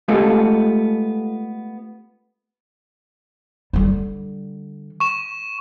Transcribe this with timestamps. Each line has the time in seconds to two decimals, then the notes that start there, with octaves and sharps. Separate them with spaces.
0.08 G#3 A3 B3 F4 G4 A4
3.73 D3 G3
5.00 C#6 E7